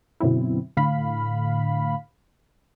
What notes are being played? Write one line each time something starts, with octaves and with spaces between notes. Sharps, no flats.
F#2 B2 D3 F#3 C4 E4
A2 D3 F5 B5